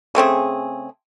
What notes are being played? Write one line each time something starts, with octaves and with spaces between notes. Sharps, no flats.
C#3 A3 C4 G#4